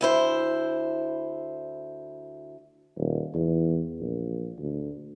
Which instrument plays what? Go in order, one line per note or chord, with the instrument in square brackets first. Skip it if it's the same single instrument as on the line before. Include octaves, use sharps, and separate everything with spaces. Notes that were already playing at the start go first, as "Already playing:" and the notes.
[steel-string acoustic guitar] D2 E4 C5
[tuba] D#1
E2
A#1
D2